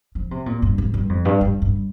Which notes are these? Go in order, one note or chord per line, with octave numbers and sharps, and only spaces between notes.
F3
C3
A#2
G2
G#2
G2
F2
G2
G2
G2